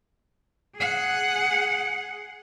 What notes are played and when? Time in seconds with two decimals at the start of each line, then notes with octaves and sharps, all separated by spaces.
0.76 G#4 F#5